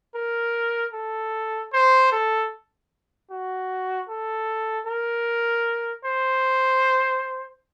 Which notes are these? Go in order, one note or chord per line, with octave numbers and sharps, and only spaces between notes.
A#4
A4
C5
A4
F#4
A4
A#4
C5